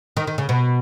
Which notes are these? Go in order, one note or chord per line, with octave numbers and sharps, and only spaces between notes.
D#3
D#3
C#3
B2